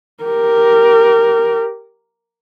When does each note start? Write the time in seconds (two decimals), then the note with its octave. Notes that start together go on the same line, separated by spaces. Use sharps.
0.24 G4 A#4